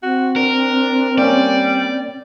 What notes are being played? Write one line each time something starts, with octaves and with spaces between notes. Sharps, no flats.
C4 F#4
D4 A#4
G3 A#3 C#4 D5